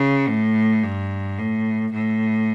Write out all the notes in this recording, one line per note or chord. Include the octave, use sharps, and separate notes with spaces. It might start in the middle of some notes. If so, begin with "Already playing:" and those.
Already playing: C#3
A2
G2
A2
A2